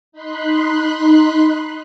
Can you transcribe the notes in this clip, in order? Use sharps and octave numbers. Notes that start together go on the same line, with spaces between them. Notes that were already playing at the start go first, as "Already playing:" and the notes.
D#4 B5 C6 F#6